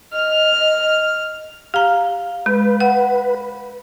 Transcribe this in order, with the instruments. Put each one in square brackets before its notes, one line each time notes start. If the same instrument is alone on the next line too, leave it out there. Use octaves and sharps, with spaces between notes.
[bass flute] D#5 [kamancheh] F6
[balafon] G4 A#5 [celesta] F5
[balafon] G#3 [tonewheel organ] B4
[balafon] F#5